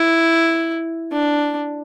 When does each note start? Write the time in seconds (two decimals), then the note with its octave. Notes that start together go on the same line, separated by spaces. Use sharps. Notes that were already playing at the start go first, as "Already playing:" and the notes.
Already playing: E4
1.12 D4